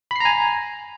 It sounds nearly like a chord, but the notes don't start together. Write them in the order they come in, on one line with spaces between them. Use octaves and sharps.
B5 C7 A#5 G#5